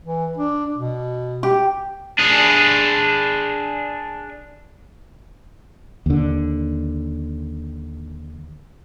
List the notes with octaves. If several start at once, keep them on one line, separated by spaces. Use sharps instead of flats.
E3
D4
B2
G4
D4 G#4
D#2 D3